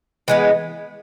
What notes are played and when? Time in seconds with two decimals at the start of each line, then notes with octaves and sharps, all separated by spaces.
0.28 E3 G#3 B3